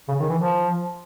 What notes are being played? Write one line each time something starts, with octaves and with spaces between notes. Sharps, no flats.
C#3
D#3
E3
F3